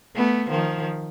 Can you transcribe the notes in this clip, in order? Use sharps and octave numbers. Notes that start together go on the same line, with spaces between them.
A3 B3
D#3 F3